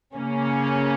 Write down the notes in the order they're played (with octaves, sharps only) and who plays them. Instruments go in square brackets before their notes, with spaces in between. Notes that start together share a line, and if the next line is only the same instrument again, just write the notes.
[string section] C#3 A#3 C#4